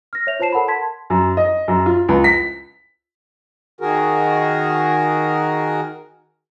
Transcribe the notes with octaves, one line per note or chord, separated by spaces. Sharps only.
F6 A#6
C#5 E5 F7
F4 C5 C#5 A5 C7 E7
A4 A#4 F#5 A5 B5
A5 C6 G#6 B6
F#2
D#5
F#2
F4
C#2
B6
D#3 F#4 G#4 A#4